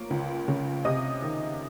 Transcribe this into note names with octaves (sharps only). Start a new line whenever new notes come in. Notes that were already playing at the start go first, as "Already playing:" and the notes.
Already playing: F3 A#3 C#5
C#2
C#3
C3 D#5 D#6
D#3